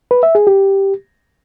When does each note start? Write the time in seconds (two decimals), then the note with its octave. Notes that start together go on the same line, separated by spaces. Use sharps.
0.11 B4
0.23 E5
0.35 G#4
0.47 G4